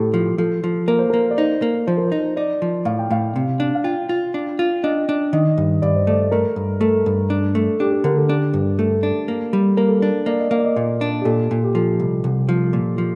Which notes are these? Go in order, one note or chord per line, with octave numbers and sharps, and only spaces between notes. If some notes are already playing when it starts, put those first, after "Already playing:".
Already playing: A2 G4 A4
F3
F3 A4
F3
A#3 A#4
C5
A#3 A#4
D5
D#4 C5
A#3
F3 C5
A#4
D#4 C5
D#4 D5
F3
A2 F5
G5
A2 F5
C3
D4
F5
F4 G5
F4
D4
F4
D4 D#5
D4
D#3 D#5
G2
G2 D5
C5
A3 D5
A3 A#4
G2
A3 A4
G2
D4
A3
D4 G4
A4
D3 A#4
A4
D4 G4
G2
A3 A4
D4
A#3
G3
A#3 A#4
A4
D4 A#4
A#3 D5
D#5
A#3 F5
D5
D#5
A#2 D5
D4
G4
A#2 A4
A#2
G4
F3 A4
C2
C2
F3
A#2
F3